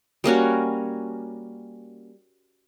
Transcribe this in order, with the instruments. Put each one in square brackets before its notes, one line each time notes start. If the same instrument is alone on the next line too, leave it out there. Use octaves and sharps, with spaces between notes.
[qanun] G3 A#3 C#4 F#4